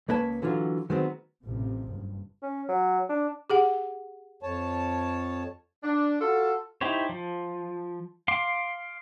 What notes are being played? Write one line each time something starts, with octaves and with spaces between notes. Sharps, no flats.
C#2 A#3 B4 C#5 A5
D3 E3 F#3 F4
D#3 F#3 G#3 B3 C4
A1 C3 F3
F#1 G2
C#4
F#3
D4
G4 G#4 F#5
F2 C#5 A5
D4
F4 F#4 A4
D#4 E4 G4 C5 C#5
F3
F5 C6 D6